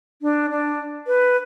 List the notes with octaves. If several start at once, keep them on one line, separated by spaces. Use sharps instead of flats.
D4
D4
B4